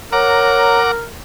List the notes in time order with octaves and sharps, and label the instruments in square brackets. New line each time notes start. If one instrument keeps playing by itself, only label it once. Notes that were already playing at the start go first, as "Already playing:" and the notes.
[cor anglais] A#4 [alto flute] C#5 [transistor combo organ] F#5 A#5 D6